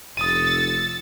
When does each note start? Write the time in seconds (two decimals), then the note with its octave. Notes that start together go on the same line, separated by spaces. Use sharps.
0.17 F1 D#6 E6 A6 C#7 D#7